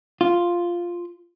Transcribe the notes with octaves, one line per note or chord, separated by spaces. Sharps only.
F4